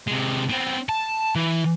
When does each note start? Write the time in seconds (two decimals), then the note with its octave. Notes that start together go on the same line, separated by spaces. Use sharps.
0.08 C3 G#3
0.50 B3 C4
0.89 A5
1.35 E3